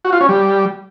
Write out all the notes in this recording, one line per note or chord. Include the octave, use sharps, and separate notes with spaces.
F#4
F4
C#4
G3